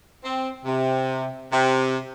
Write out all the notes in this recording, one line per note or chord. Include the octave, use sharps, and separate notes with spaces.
C4
C3
C3